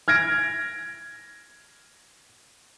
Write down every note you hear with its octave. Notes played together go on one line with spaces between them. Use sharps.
F6 G#6 A#6 D7